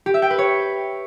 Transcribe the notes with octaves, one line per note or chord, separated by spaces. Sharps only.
G4
E5
G5
B4
C#5